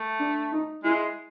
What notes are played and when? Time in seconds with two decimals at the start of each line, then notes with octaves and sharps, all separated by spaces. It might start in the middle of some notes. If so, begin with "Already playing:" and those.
Already playing: A3
0.19 D4
0.52 D#4
0.84 G#3 E4